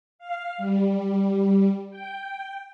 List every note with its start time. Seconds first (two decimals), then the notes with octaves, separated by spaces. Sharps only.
0.19 F5
0.58 G3
1.90 G5